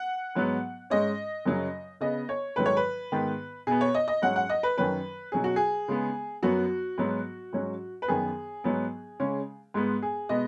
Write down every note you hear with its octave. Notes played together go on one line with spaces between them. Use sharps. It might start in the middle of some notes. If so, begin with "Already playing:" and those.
Already playing: F#5
G#2 F#3 B3
G#2 G#3 C#4 D#5
F#2 C#3 F#3 C#4
C#3 B3 D#5
C#5
G#2 D#3 F#3 B4
C#5
B4
G#2 D#3 B3
B2 B3 G#4
C#5
D#5
D#5
G#2 F#3 C#4 F#5
F#5
D#5
B4
F#2 D#3 F#3 C#4 B4
B2 F#3 C#4 G#4
F#4
G#4
C#3 G#3 B3
F#2 F#3 B3 F#4
G#2 F#3 B3
G#2 F#3 C#4
B4
F#2 D#3 B3 G#4
G#2 F#3 B3
C#3 G#3 C#4
G#2 G#3 B3
G#4
B2 G#3 B3 D#5